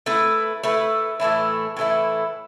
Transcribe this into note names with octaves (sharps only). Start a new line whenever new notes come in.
A3 E4 B4
A3 E4 B4
A2 E3 A3 E4
A2 E3 A3 E4